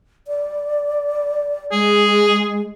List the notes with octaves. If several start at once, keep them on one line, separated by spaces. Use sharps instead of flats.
D5
G#3 G#4